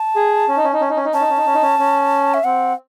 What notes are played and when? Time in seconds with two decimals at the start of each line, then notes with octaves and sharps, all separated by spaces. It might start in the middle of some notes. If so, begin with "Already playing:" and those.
Already playing: A5
0.15 G#4
0.48 C#4
0.57 D#4
0.64 C#4
0.73 D#4
0.81 C#4
0.89 D#4
0.97 C#4
1.05 D#4
1.13 C#4 A5
1.21 D#4
1.30 C#4
1.37 D#4
1.46 C#4
1.54 D#4
1.62 C#4
1.79 C#4
2.34 E5
2.44 C4 F#5